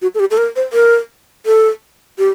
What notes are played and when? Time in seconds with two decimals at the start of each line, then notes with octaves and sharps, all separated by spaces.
0.02 F#4
0.15 A4
0.20 G4
0.31 A4
0.37 A#4
0.56 C5
0.73 A#4
1.46 A4
2.18 G4